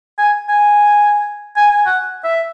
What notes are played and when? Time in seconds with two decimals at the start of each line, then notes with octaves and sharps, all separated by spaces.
0.18 G#5
0.49 G#5
1.56 G#5
1.70 G#5
1.86 F#5
2.24 E5